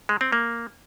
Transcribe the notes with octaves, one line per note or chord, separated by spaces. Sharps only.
G#3
C4
A#3